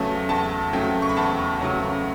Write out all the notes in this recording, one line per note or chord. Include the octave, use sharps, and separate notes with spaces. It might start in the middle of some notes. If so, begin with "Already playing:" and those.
Already playing: E2 C#3 F#3 A3 C#4 A5
E2 A5
C#3 F#3 A3 C#4 G5
C#6
B5
E2 A5
C#3 F#3 A3 C#4